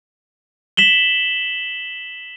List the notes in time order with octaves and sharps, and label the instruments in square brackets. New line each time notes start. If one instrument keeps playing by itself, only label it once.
[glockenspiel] B6 E7 F#7 G7